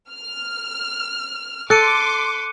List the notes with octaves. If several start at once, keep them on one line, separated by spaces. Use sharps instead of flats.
F6
A4 C6 D6 F#6 C#7 D#7